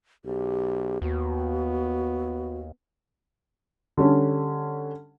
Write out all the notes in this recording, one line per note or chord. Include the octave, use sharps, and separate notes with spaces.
B1 G4
D#2 B3 F#4
D3 G3 C#4 A4